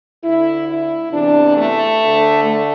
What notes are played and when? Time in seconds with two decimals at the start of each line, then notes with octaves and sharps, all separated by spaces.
0.23 D2 D3 E4
0.67 E4
1.11 E2 C3 E3 D4
1.55 A3
1.99 D2
2.04 D3
2.43 A3